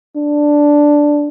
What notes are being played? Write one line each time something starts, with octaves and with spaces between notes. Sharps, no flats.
D4